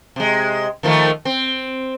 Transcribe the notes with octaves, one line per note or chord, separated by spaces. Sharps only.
C3 G#3
D#3 F3 A3
C4